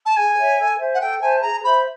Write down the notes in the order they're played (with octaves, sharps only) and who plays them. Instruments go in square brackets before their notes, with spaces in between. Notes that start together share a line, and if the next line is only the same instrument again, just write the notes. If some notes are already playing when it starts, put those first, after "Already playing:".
[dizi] A5
[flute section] G#4 [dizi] G#5
[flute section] C#5 E5
A4
C5 E5 G#5
[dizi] F#5
[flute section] A4 [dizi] G5
[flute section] C5 E5 A5 [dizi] G#5
[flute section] G#4 [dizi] A#5
[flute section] C5 E5 [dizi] B5